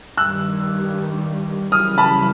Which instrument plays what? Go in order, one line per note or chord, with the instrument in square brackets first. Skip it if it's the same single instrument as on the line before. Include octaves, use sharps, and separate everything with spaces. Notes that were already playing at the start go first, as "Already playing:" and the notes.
[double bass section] G2 D#3 G3 [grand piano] E6 F#6
[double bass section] F#2 C#3 E3 G3 [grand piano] D#6 F6
[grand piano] A5 B5